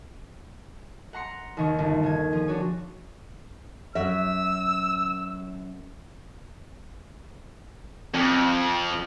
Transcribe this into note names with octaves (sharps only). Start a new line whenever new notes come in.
F#5 A#5 C6 C#7
D#2 D#3 C#6
G1
D#3 G#6
F3 G#4
D4 F#4 C#5
F#2 E5 E6
F2